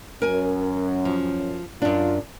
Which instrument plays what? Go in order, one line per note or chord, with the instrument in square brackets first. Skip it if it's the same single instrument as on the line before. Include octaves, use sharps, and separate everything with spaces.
[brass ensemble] F#2 C#4 [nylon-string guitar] A#4 G#5
[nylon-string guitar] F3
[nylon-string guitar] F#2 D4 [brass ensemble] F4